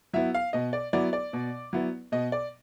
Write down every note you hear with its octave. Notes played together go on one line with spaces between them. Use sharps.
F#3 B3 E4 E5
F5
B2 D#5
D5
F#3 B3 E4 D5
D5
B2
F#3 B3 E4
B2 D#5
D5